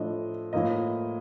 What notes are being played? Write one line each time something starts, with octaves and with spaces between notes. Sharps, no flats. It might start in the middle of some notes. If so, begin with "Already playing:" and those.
Already playing: A2 F3 A3 D4 D#5
A2 F3 A#3 D#5